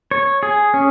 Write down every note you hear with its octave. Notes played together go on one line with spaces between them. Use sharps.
C#5
G#4
C#4